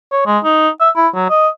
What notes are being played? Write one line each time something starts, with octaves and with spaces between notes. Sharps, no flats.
C#5
G#3
D#4
E5
E4
F#3
D#5